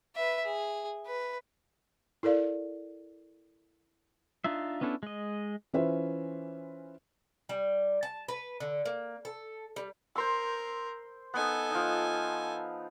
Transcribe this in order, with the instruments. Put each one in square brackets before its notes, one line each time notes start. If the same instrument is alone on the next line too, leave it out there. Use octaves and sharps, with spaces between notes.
[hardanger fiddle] B4 E5
G#4
B4
[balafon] E4 A4 A#4 D5 F5
[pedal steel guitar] D4 D#4 F4 E5
B3 C#4 D4 E4 A4
G#3 D#5
[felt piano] E3 C#4 F4 B4 C5 E5
[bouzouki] G3
A5
B4
D3
A#3
A4
G3
[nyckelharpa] A#4 [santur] C5 C6 E6
[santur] B3 D#4 [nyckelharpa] A4 G#5
[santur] F3 D#4